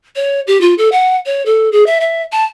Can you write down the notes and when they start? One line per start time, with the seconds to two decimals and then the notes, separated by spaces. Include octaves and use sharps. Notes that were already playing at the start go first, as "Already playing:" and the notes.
0.16 C#5
0.47 G4
0.61 F4
0.78 A4
0.92 F#5
1.26 C#5
1.46 A4
1.72 G#4
1.86 E5
2.01 E5
2.32 A5